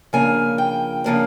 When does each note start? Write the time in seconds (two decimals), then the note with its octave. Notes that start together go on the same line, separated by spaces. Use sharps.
0.13 C#3 F3 A#3 D4 G#5
0.58 G5
1.04 C#3 F3 A#3 D4